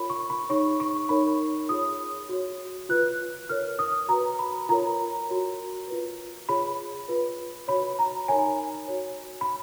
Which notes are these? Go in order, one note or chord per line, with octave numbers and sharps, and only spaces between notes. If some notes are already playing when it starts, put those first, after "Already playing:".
Already playing: F4 A#4 C#5 B5
C#6
B5
D#4 G#4 C#5 C#6
C#6
D#4 A#4 C#5 B5
F4 G#4 C#5 D#6
F#4 C#5
F4 B4 F#6
F4 A#4 C#5 F6
D#6
F#4 B4 A#5
B5
F4 A#4 C#5 A#5
F#4 A#4 C#5
F4 B4
F4 G#4 C#5 B5
F4 B4
F#4 C#5 B5
A#5
D#4 A#4 C#5 G#5
F#4 C#5
B5